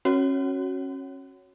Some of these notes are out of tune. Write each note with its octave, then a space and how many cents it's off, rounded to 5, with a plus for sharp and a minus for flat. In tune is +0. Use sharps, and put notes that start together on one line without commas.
C#4 -30 F#4 +0 C#5 +0